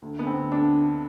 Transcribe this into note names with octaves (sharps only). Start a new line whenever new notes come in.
D2
D3 B3
C4
D2
D2 D4
D3
D3